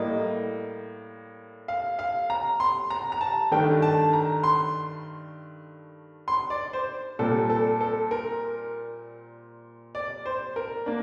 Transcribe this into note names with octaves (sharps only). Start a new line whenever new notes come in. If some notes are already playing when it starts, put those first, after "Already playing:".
Already playing: A2 G3 A#3 D#5
F5
F5
A#5
C6
A#5
A#5
A5
G2 D#3 A3 D4 G5
A5
A#5
C6
C6
D5
C5
A#2 G3 C4 A4
A4
A4
A#4
D5
C5
A#4
A#3 D4